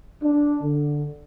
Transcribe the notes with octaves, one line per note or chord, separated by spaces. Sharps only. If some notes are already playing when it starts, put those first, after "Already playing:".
D4
D3